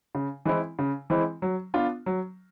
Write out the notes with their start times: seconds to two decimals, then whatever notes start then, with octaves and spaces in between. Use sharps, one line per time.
0.15 C#3
0.45 E3 G#3 C4 E4
0.79 C#3
1.10 E3 G#3 C4 E4
1.42 F#3
1.74 B3 D4 F4
2.06 F#3